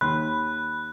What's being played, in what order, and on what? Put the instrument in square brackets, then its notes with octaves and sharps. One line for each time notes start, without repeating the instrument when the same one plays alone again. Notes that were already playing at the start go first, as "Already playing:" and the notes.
[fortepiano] D#2 C6 [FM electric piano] B5 [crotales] F#6